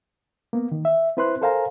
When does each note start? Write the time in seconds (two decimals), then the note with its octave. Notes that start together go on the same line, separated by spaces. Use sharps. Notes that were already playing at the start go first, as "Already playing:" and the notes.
0.53 A#3 B3
0.72 D#3
0.85 E5
1.17 C4 E4 B4 C5 C6 F#6
1.41 A4 A#4 C5 F5 G#5 A#5